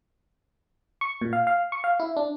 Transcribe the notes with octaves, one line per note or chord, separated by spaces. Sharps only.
C#6
A#2
F5
F5
C#6
F5
E4
D4